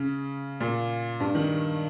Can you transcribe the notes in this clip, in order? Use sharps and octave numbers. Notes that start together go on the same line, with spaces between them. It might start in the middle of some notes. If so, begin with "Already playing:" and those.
Already playing: C#3
A#2
G2
D#3